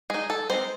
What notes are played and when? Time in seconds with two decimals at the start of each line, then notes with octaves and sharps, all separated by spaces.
0.10 G#3 D#4 G#4
0.30 A4
0.50 G#3 C4 D#4 C5